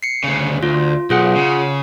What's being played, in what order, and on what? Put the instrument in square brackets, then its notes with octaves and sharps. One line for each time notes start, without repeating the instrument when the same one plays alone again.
[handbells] C7 C#7
[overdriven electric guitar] D2 C#3
[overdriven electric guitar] D2 [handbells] F4
[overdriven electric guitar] B1 [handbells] F4 G#4 F#5
[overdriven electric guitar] C#3